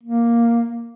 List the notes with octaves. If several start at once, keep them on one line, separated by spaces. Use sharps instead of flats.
A#3